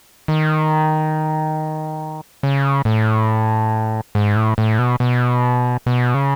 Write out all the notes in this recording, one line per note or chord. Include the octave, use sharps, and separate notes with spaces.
D#3
C#3
A2
G#2
A2
A2
B2
B2
B2
C#3